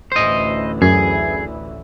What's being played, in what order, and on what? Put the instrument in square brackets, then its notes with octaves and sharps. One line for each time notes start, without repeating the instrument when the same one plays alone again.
[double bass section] A1 D2 E3 [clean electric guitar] C5 D#5
[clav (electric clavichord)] F#2 [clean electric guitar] G#4